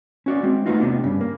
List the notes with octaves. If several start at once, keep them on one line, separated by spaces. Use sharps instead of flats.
C#4 F#4 D5
G#3 C4
A3 B3 C4 D#4 F4 F#4
C3 B3 D4
G2 C#3
A#3